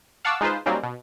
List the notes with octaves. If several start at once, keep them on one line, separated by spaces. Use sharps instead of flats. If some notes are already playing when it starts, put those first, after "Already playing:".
F5 F#5 A5 C#6 D6 E6
G#3 D#4 F4 B4 C5
F#3 G3 A#3 C4 C#4 D#4
B2